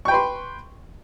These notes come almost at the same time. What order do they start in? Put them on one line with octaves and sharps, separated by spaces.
C#6 G5 B4 C6